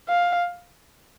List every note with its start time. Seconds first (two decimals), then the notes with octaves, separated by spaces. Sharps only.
0.09 F5